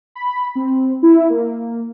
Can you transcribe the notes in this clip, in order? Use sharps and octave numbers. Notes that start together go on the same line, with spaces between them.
B5
C4
E4
A#3